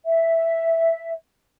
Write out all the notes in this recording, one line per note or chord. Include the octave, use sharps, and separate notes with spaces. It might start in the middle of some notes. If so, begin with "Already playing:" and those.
E5